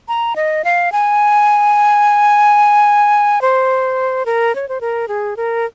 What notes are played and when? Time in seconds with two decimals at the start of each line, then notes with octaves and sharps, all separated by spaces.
0.08 A#5
0.36 D#5
0.64 F5
0.92 G#5
3.41 C5
4.26 A#4
4.55 C#5
4.69 C5
4.81 A#4
5.08 G#4
5.37 A#4